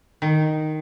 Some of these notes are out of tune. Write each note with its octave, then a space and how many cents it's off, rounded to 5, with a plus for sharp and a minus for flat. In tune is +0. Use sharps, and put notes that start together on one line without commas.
D#3 -5